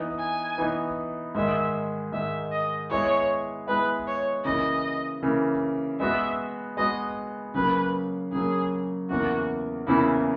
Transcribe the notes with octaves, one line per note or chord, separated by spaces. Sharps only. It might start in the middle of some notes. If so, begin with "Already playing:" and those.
Already playing: E3 B3 D#4
G#5
E3 B3 D#4
G#2 D#3 G#3 E5
G#2 D#3 G#3 E5
D#5
G#3 B3 E4 G#4 C#5
G#3 B3 E4 G#4 B4
C#5
C#3 E3 A#3 D#5
C#3 E3 A#3
G#3 B3 F#4 E5
G#3 B3 F#4 D#5
C#3 F#3 A#3 B4
C#3 F#3 A#3 G#4
E2 C#3 E3 A#3 F#4
E2 C#3 E3 A#3 E4